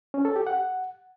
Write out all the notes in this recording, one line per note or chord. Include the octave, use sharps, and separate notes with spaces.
C#4
A4
G4
F#5